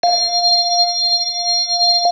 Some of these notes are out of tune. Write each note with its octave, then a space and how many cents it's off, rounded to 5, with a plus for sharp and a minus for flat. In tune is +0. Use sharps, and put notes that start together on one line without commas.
F5 +5